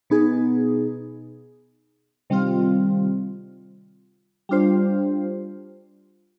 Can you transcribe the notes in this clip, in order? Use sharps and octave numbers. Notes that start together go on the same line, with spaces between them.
B2 B3 D#4 G#4
C3 D#3 G3 C4 F4
G3 D4 F4 C5